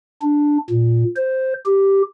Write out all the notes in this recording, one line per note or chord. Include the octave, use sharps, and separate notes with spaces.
D4
A#2
C5
G4